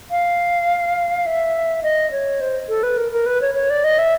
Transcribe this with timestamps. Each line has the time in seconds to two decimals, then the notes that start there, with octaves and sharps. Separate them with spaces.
0.11 F5
1.26 E5
1.83 D#5
2.11 C#5
2.41 C5
2.69 A4
2.83 B4
2.97 A#4
3.12 A#4
3.26 B4
3.41 C#5
3.55 C#5
3.70 D5
3.84 D#5
3.98 E5